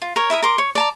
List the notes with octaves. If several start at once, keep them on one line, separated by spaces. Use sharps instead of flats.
F4
A#4 C#5
E4 A#4 E5 D#6
A#4 C6 D6
C#5
D5 A5 A#5